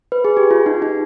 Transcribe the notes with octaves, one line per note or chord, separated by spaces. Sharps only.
B4
G#4
G4
F4
D#4
D#4